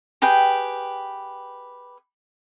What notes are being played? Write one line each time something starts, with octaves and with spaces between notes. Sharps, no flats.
G4 G#4 B4 G5